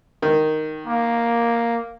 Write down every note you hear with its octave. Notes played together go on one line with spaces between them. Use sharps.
D#3
A#3